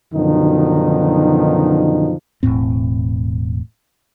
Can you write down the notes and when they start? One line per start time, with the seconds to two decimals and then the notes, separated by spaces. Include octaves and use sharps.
0.13 F#2 B2 D3 D#3 F3 D#4
2.43 E1 B1 A2 C4